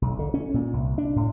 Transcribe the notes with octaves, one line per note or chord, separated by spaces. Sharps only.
B1
D3
C#4
A#2
C2
D4
A2